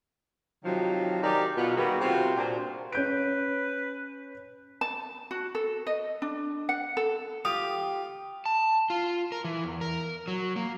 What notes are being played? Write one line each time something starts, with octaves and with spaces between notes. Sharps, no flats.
C3 D#3 F3 F#3
D#4 G4 G#4 A#4 D5
B2 B3 F4
D#3 G3 A#3 F#4 G#4 B4
C3 C4 F4 F#4
A#2 D4 C5
C#4 B4 G6 D7
A5
F#4
A4
D#5
D4
F#5
A4
F4 G4 D#6
A5
F4
A#4
E3
E2
A#4
F#3
A#3